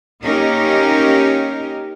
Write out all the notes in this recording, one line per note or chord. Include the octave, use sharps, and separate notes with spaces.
A#3 C#4 D#4 G4 A#4